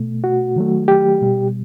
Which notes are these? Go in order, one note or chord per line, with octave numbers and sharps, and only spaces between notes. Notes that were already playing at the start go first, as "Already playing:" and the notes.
Already playing: B2 A3
F#4
D#3 F#3 A3
G4
B2 G3